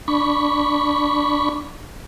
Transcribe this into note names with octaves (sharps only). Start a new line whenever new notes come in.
D4 B5 C#6